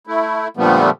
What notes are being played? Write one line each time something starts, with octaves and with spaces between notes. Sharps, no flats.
A3 E4
A#2 D3 F3 G3 A3 B3